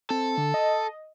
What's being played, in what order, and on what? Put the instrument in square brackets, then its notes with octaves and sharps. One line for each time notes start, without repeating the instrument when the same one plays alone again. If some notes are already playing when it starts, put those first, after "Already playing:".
[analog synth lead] C4 [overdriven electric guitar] A4
[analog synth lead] D3
D#5